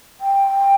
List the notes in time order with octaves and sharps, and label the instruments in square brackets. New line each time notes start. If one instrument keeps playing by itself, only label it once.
[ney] G5